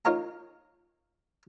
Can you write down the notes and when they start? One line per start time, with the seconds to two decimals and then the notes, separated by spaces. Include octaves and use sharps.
0.05 D#4 F4 A#4 C#5 D#5 A#5